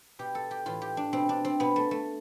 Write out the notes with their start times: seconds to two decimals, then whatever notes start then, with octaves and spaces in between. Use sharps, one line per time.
0.19 B2 G4
0.35 A4
0.51 G4
0.66 A2 E3 F4
0.82 G4
0.97 D4
1.13 B2 C4
1.29 D4
1.45 C4
1.60 B2 B3
1.76 A3
1.91 A3